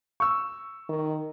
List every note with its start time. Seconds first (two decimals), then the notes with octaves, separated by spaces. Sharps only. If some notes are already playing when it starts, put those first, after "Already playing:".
0.20 C#6 E6
0.89 D#3